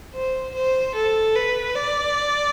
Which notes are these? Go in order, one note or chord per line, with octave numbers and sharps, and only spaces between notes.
C5
C5
A4
B4
D5